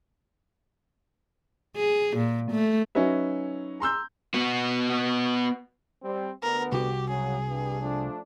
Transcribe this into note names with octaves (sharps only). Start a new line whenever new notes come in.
G#4
A#2
A3
F#3 C#4 D#4 B4 E5
A#5 C6 E6 G6
B3 F#4
G3 C4
D2 D3 B3 A#4
C2 F#4 G4
C#3 F#3 G#4
G2
F3 A3 D4